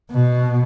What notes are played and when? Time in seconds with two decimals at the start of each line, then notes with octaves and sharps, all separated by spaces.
0.12 B2